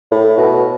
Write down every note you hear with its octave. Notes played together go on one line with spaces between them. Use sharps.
A2
B2